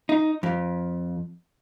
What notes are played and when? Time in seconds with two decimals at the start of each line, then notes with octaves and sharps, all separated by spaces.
0.09 D#4
0.43 F2